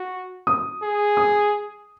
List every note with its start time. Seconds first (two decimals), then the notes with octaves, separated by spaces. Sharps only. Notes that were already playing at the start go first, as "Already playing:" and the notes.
Already playing: F#4
0.47 D#6
0.82 G#4
1.17 D#6